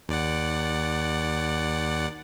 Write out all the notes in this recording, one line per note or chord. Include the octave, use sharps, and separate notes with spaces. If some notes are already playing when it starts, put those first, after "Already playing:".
D#2 D5 F#5